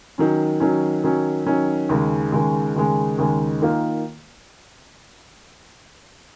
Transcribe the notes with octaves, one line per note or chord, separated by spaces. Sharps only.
D#3 F#3 C#4
D#3 F#3 C#4
D#3 F#3 C#4
D#3 F#3 C#4
D#2 C#3 G#3
D#2 C#3 G#3
D#2 C#3 G#3
D#2 C#3 G#3
D#3 A#3 F4